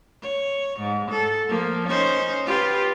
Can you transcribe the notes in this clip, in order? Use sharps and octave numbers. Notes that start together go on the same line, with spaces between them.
C#5
G#2
A4
F3 A#3
C#4 D#4 C5
F4 G4 B4